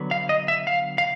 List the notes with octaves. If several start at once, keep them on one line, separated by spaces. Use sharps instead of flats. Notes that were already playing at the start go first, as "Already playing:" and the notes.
Already playing: D3 F#3 B3
F5
D#5
E5
F5
F5